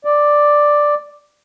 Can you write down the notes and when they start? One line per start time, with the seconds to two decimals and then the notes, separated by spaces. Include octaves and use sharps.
0.05 D5